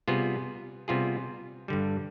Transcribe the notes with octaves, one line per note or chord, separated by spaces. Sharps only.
C3 G3 B3 F4 G#4
C3 G3 B3 F4 G#4
G2 D3 G3